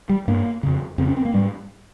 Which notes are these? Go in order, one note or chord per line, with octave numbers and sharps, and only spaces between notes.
G3
G2 A#3
F2 C#3
F2 C#3 C4
C#4
C4
A#3
G#2 G3